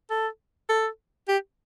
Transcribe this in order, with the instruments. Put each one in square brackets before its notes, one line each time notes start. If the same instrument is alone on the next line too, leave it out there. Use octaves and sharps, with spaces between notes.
[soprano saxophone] A4
A4
G4